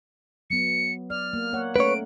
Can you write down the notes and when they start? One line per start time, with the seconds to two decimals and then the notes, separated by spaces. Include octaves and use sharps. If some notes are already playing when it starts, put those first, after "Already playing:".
0.50 F#3 B3 C#7
1.10 D5 F6
1.33 A#3
1.53 A#3 C#5 F#5
1.76 A3 C#4 B4 C#5 D7